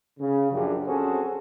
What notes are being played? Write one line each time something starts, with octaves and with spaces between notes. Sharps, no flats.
C#3
A#1 F#2 F3 D4 G4
C4 C#4 F#4 G#4 A4 C5